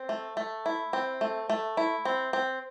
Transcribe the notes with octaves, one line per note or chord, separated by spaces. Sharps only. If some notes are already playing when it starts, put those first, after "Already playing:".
Already playing: C4
A3
A3
E4
C4
A3
A3
E4
C4
C4